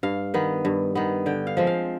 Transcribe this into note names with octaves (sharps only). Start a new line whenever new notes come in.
G2 F5
D#3 B3
G2
D#3 B3
D3 G5
F5
F3 G#3 C4
F5